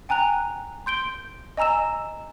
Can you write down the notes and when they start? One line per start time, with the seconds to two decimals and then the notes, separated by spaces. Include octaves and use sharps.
0.09 G5 G#5 A#5 F#6 F7
0.86 C6 G6 D7 G7
1.57 D#5 G#5 A#5 E6 E7